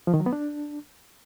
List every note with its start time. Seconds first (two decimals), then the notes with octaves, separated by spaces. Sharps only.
0.07 F3
0.14 D#3
0.20 F#3
0.26 B3
0.33 D4